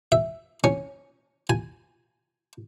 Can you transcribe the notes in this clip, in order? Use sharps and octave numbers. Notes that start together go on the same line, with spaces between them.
E5
C#4
G#5